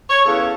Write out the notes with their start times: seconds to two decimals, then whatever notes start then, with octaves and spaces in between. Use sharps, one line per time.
0.09 C#5
0.24 E2 C#3 E3 A4